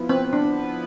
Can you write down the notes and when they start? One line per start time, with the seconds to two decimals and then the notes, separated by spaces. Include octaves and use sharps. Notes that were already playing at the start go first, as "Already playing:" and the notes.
Already playing: F3 B3 E4
0.09 C4 B4
0.33 D4